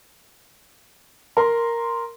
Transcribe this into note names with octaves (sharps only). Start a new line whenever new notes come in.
A#4 C6